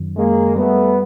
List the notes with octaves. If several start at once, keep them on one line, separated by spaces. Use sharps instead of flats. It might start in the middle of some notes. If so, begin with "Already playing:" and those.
Already playing: F#2 D#3 F#3
F#2 G#3 A#3
G3 A3 B3